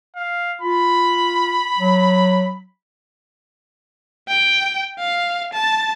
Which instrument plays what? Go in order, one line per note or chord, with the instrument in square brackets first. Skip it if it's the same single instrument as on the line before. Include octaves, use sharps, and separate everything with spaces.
[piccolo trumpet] F5
[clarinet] F4 [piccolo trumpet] B5
[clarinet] F#3
[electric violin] G5
F5
A5